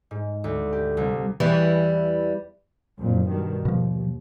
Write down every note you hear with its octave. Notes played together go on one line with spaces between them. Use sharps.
G#2
D2
G4
C2
E2 E3 G3
F#1 F2 A#2
G2 B2 D#3
D#2 B2 F3